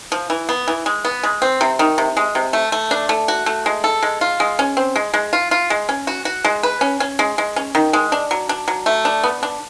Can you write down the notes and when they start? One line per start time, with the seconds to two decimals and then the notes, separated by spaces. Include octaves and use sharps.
0.12 F3
0.30 E3
0.49 B3
0.68 E3
0.86 G#3
1.05 B3
1.23 G#3
1.42 C4
1.61 C3
1.79 D#3
1.98 C3
2.17 G#3
2.35 C3
2.53 A3
2.72 A3
2.91 D4
3.09 A3
3.28 F#4
3.46 A3
3.66 G#3
3.84 A4
4.03 G#3
4.21 F4
4.40 G#3
4.59 C#4
4.77 C4
4.96 G#3
5.14 G#3
5.33 F4
5.51 F4
5.70 G#3
5.89 C#4
6.07 F#4
6.25 F#4
6.44 G#3
6.63 B4
6.81 C#4
7.00 C#4
7.19 G#3
7.38 G#3
7.56 C#4
7.75 D#3
7.93 G#3
8.12 D4
8.31 F#3
8.49 D4
8.68 F#3
8.86 A3
9.05 D4
9.24 B3
9.43 D4